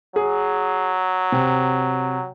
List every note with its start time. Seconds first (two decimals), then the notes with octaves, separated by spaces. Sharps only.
0.16 F#3 G#4
1.32 C3